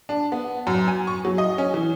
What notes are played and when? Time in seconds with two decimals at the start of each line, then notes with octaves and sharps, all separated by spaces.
0.09 D4
0.32 B3
0.67 F#2
0.88 G#5
1.07 C#6
1.25 F#3
1.38 D#5
1.58 C#4
1.74 E3